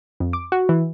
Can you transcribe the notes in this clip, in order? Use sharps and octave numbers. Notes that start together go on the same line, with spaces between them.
F2
D6
F#4
E3